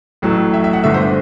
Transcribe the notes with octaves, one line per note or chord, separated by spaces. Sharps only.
A1 A2 F#3 A3
E5
E5
F#5
G1 G2 D3 A3 E5
C5